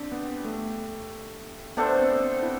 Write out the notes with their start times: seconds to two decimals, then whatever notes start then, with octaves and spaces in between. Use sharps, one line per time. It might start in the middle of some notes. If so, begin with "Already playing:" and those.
Already playing: C4 D4 G4
0.12 B3
0.45 A3
1.77 A3 B3 D4 A4 C5
1.99 C4
2.20 C4
2.43 E4